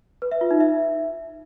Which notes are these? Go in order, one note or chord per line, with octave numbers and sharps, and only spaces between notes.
B4
E5
F4
D#4
E5